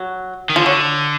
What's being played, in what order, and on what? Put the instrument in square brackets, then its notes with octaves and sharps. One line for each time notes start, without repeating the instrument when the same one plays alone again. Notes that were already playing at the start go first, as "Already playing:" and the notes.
Already playing: [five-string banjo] F#3
[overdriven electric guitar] D#3
[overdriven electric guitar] D3 [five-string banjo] F3
[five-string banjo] F#3